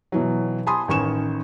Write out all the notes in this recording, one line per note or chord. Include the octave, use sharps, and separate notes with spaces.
B2 E3 F#3
G#5 A5 B5 C6 D#6
A1 D#3 G#5 C#6 E7